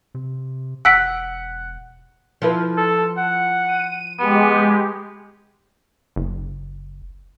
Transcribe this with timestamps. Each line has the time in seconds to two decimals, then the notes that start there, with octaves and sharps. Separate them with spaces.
0.15 C3
0.85 E1 F#5 E6 B6 D7
2.42 F3 E4 B4
2.78 A4
3.17 F#5
3.66 D#7
4.20 G#3 B3 G4
6.16 F#1